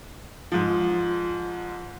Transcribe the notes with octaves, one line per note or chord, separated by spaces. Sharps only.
G#2 F3